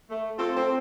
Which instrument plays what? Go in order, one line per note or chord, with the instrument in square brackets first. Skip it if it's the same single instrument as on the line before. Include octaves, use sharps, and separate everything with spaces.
[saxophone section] A3
C4 F4 A4
C4